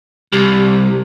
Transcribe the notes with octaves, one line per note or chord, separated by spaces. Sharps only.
C2 G4